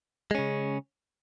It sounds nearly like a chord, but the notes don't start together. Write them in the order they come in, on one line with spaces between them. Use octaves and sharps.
G#3 C#4 C#3